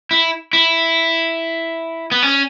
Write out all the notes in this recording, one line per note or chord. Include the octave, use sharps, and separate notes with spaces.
E4
E4
B3
C#4